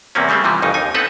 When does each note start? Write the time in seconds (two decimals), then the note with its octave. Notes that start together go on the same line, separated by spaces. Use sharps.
0.15 E2 C3 A#3 C4 C#4
0.29 C#3 G3 A3 A#3 C4
0.44 C3 E3 F3 G3
0.62 G1 F2 C#3 D#4
0.74 D#2 D#4 G#5
0.94 B3 C4 D#4 A4 B4 F#5